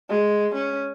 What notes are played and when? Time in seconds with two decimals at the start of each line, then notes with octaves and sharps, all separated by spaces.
0.10 G#3
0.55 C#4